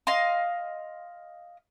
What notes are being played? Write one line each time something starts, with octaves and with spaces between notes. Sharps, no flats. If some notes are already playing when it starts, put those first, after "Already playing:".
D#5 F5 C6